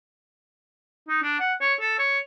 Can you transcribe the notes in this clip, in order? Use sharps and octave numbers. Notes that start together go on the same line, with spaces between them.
D#4
D4
F#5
C#5
A4
C#5